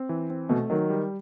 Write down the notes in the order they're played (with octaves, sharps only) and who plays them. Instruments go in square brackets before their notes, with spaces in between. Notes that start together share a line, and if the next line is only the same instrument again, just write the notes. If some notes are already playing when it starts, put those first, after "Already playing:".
Already playing: [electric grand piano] C4
E3
C4
[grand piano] B2 [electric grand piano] A3
[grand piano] D#3 [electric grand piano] F#3
[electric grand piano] G3